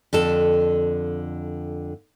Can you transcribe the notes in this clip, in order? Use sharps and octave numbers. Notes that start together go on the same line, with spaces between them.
F2 D3 A4